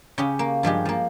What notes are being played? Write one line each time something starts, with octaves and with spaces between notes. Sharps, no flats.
C#3 C#4 G4
A#3
G2 F3 G#3 G4
F3 A#3